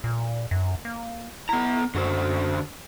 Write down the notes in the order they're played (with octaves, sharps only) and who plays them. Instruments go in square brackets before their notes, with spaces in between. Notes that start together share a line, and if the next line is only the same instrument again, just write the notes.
[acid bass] A#2
F#2
A#3
[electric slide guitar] B3 A#5 [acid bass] E4
[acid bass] F#2 [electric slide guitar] D3 F#4 C5